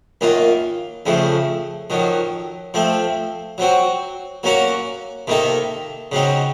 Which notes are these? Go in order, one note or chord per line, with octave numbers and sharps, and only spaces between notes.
F#2 D#3 A#3 F4
F2 C#3 F3 A3
F2 D#3 F#3
F3 A3 C4
F#3 C4 F#4
F#3 A#3 C#4 F#4 A#4
C3 D#3 A#3 D#4 A4
C#3 F#3 C4 D#4